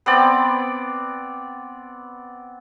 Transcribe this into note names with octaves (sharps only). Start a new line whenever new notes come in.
B3 C4 D5